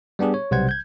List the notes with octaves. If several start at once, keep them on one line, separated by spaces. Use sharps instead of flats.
G3 B3 D4 G4 G#4
C#5
B1 C3 G3 C5 F#5 G#6
G6 G#6